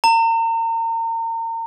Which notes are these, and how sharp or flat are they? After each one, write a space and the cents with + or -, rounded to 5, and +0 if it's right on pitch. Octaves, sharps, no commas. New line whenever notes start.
A#5 -35